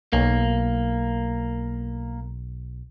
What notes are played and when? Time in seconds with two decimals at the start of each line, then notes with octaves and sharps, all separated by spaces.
0.13 B1 A#3